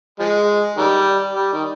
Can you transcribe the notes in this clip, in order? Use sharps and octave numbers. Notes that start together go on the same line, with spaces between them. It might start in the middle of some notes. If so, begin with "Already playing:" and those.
F3 G#3
D#3 G3
G3
D#3